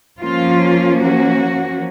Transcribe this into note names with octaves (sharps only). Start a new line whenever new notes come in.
F3 A#3 C#4 F4
F#4